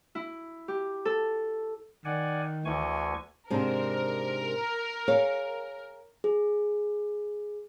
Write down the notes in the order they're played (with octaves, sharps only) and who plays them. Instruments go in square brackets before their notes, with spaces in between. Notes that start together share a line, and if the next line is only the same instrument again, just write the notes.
[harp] E4
G4
A4
[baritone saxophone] D#3 [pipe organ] D5 F#5 G#5
[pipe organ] D2 G#5 C#6 [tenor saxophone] E3
[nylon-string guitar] G#2 C3 D4 [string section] A#4
[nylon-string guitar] G#4 C#5 F5
[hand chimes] G#4